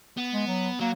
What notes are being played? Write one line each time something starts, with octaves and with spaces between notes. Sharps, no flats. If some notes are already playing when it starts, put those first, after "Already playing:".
B3
G#3
F#3
F#3 A#3